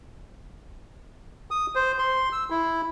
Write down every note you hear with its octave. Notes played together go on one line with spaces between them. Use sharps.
D#6
C5
C6
E6
E4